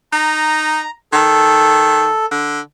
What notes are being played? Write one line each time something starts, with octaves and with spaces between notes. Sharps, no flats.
D#4 A#5
D#3 A4
D3